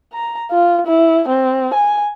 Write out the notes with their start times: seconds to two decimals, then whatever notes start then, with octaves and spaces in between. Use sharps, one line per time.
0.13 A#5
0.51 F4
0.86 E4
1.28 C4
1.74 G#5